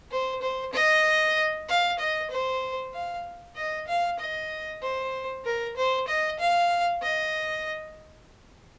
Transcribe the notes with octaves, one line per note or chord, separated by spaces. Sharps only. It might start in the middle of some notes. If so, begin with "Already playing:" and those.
C5
C5
D#5
F5
D#5
C5
F5
D#5
F5
D#5
C5
A#4
C5
D#5
F5
D#5